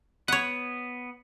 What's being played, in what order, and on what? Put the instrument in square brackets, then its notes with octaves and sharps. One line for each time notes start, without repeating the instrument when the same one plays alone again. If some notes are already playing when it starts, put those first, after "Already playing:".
[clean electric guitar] B3 [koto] C#5 F#5